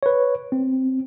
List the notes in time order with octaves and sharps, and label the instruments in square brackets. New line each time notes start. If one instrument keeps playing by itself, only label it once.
[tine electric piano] B4 C#5
C4